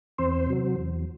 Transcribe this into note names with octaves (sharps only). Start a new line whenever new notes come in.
E2 C4 C5
C3 F#3
E2